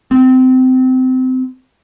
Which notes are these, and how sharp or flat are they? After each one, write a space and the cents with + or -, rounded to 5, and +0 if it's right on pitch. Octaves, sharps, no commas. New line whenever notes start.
C4 -25